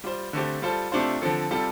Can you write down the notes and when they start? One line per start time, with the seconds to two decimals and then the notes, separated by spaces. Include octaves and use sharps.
0.04 G3 F4 C5
0.33 D3 A3 C4 G4
0.62 G3 F4 A4 C5
0.92 C3 A3 D4 F4 C5
1.22 D3 F3 C4 A4
1.51 C3 G3 F4 A4